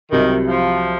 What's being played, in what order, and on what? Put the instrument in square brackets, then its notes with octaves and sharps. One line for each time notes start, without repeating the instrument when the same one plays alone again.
[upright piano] C2 C3 F#3 [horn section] D#3
[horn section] F3